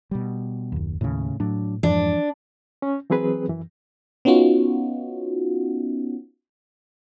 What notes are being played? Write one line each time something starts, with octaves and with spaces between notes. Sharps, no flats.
B2 G3
F#1 D#2
D#2 A2 C#3
A2 F#3 D4
F2 G#2 E3 F3 D4
C#4
E3 F#3 C4 G#4 B4
F#2 E3
B3 C#4 D#4 F4 F#4